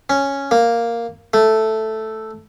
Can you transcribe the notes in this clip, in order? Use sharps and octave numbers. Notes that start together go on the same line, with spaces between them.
C#4
A#3
A3